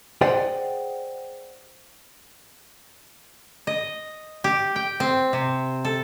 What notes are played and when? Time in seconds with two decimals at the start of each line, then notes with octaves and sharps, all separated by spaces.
0.21 G#4 C5 D5 D#5 F#5 G5
3.67 D#5
4.44 G4
4.76 G5
5.00 C4
5.33 C3
5.85 A4